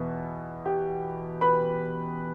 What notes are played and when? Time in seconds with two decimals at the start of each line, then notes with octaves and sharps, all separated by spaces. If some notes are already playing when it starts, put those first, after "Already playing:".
Already playing: E2 B2 B3 E5
0.65 G4 G5
1.41 B4 B5